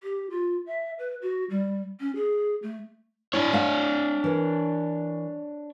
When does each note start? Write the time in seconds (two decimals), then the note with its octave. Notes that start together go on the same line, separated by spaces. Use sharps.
0.03 G4
0.30 F4
0.67 E5
0.99 B4
1.22 F#4
1.50 G3
2.00 C#4
2.16 G#4
2.63 A3
3.33 D4 E4 C#5
3.53 A3 F5 F#5
4.24 E3 A#4